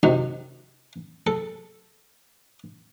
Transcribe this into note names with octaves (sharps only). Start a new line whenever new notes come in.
F#2 C3 D#3
A4